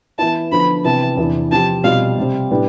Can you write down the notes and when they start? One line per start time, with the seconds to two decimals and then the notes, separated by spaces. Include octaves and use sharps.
0.19 E3 B3 E4 A5
0.51 D3 F3 B3 B5
0.84 C3 E3 B3 A5
1.17 E2 C3 E3 B3 D4
1.51 C3 F3 C4 G4 A5
1.84 B2 G3 C4 F4 F5
2.18 C3 G3 C4
2.51 A2 G3 B3 D4